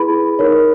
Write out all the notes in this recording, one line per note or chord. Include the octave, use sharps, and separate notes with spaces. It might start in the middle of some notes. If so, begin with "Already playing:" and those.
Already playing: E4 G#4 B4 B5
D#4 A#4 C#5